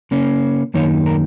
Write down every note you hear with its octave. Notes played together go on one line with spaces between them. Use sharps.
C#3 A#3 C#4
F#2 D#3 A#3 D#4 C#5
A#4